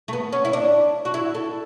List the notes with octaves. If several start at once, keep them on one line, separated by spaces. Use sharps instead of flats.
A3
B3
C#4
E4
D4
F#4
E4
A4